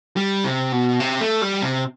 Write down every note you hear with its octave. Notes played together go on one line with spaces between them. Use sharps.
G3
C3
B2
C3
A3
G3
C3